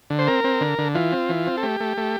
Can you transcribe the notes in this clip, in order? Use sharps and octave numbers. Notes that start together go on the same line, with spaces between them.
D3
C5
C4 A#4
C4
D3
D3
E3 F4
C4
E3
C4
A4
A3 G4
A3
A3